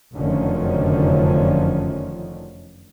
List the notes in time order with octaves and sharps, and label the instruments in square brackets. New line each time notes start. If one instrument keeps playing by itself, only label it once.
[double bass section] F1 F#2 D3 D#3 F3 C#4